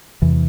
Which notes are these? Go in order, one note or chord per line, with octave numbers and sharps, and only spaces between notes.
E2 C3 E3